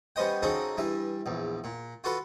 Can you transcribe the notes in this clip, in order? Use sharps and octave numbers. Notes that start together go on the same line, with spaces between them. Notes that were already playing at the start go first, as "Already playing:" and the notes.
G3 B3 C#4 C5 D#5 G5
C#3 C4 D#4 F#4 G#4 A4
G2 E3 E5
A#1 E2
A#2
F4 F#4 A4 B4